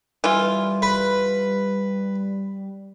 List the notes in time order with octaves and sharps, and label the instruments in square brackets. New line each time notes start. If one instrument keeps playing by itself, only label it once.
[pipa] E3 F4 [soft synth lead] G3
[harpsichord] B4